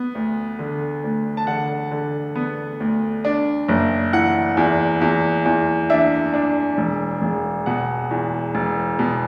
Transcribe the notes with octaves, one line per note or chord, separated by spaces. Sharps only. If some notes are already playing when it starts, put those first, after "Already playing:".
Already playing: B3
D2
D3
D2
A5
D3 F#5
D3
B3
D2
D4
F#1
E3 F#5
E2
E2
E2
D4 E5
D4
E1
E1
B2 F#5
E2
E1
B2